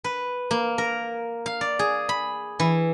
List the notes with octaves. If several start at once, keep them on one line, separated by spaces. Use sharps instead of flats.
B4
A#3
A#4
F5
D5
G#4
B5
E3